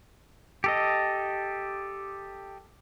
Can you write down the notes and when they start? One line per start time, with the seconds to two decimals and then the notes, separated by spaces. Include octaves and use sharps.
0.64 G4 A4 D#5